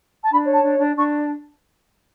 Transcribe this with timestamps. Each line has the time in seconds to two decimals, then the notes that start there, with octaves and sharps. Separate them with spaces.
0.24 A5
0.31 D4 B5
0.46 C#5
0.52 A5
0.63 D4
0.79 D4
0.96 D4 C#6